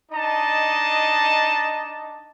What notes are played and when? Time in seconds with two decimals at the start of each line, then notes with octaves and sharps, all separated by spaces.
0.10 D4 D#4 D#5 A5